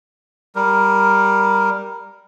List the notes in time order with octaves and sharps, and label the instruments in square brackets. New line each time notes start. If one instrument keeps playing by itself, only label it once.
[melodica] G3 A#4